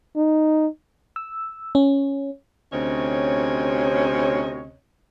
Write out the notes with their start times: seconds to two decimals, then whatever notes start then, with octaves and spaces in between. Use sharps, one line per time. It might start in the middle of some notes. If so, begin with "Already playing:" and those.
0.16 D#4
1.16 E6
1.75 C#4
2.73 D2 C3 C4 C#4 C#5 D#5